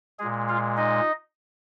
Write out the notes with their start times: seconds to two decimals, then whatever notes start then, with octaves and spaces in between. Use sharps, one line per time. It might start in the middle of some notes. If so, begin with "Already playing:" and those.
0.19 A#2 G#3 G#4
0.49 F4 F5
0.77 D#4 D#5